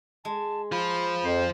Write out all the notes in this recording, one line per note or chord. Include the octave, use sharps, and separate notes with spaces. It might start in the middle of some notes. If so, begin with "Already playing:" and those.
G#3 A5
F3 F4 B5
F2 C5